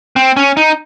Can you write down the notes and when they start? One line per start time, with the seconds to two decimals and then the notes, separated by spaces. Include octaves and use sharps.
0.16 C4
0.37 C#4
0.57 D#4